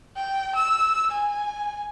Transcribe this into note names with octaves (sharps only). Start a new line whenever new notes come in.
G5
E6
G#5